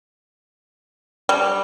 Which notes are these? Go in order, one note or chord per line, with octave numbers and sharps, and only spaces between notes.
G3